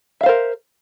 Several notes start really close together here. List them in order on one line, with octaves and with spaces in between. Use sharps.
E5 F5 C5 A#4